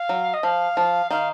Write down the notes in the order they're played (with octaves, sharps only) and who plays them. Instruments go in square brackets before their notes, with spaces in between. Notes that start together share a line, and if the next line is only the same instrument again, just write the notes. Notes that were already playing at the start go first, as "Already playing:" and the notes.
Already playing: [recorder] F5
[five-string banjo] F#3
[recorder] D#5
[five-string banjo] F3 [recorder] F5
[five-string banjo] F3
[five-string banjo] D#3 [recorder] F5